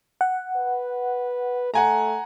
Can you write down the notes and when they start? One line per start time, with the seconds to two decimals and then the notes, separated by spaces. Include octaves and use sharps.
0.21 F#5
0.56 B4
1.74 A3 F#5 G#5 A#5